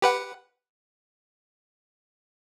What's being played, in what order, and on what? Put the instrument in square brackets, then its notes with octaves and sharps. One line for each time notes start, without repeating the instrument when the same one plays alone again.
[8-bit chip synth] G4 B4 F#5